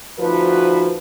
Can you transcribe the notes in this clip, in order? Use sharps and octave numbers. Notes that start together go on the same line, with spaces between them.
D2 F3 D#4 F#4 B4